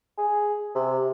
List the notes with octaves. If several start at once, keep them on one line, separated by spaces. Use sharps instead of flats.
G#4
C3